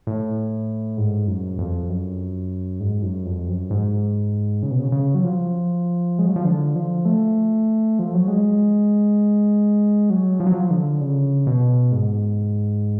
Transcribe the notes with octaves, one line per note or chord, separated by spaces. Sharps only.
A2
G#2
F#2
F2
F#2
G#2
F#2
F2
F#2
G#2
C#3
B2
C#3
C#3
F#3
F3
G#3
F#3
F3
D3
F3
A3
F3
F#3
G#3
F#3
F3
F#3
F3
D3
C#3
B2
G#2